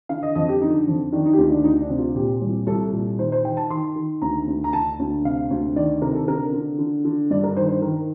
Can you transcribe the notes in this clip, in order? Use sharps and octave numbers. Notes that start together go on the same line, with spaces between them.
D3 F5
D#5
F2 D#5
G4
D3 D#4
F2
D#3 D4
D#4
G4
D2 F4
D4
D2 D#4
D4
C3
F4
A#2 G4
C2
C2 A4
A#2
D#3 C5
C5
D#3 G5
A5
D#3 C6
D#3
D2 A#5
D2
A#5
D3 A5
D2
C3 F5
D2
D#3 D5
C3 A#4
A4
D3 A#4
D3
D3
D3
G2 D5
A#4
D#3 C5
C5
D#3 A#4